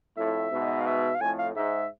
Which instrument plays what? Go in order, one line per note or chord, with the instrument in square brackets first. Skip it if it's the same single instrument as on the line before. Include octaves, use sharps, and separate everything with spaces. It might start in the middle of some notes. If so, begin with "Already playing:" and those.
[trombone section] F2 A2 [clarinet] E5
[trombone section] G#2 B2
[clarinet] F5
E5
F5
[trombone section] F2 A2 [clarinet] G#5
[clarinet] F5
[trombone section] G#2 [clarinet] E5